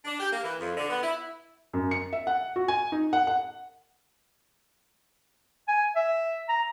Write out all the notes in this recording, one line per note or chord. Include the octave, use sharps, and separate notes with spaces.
D4
G4
A#3
E3
F2
D3
B3
E4
F#2
C#7
E5
F#5
F#4
G#5
D#4
F#5
F#5
G#5
E5
A#5